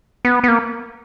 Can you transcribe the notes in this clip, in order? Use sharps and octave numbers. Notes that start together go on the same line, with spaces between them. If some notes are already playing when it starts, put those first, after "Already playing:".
B3
B3
A#3